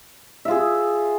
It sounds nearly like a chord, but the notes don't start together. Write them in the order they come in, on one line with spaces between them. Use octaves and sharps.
E5 F4 G#4